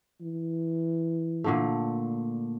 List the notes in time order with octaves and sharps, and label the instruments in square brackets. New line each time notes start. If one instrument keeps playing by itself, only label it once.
[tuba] E3
[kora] A#2 D3 A3